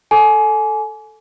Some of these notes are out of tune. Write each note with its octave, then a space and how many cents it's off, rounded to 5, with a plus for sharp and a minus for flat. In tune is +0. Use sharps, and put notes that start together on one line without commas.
A4 +0 G#5 +25 D6 -20